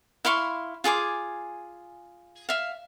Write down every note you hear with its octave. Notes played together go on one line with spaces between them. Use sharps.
E4 F5 C6 C#6
F4 G#4 G#5 D6
E5 F5